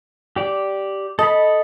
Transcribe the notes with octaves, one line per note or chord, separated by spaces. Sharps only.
G4 D5
A4 D#5 B5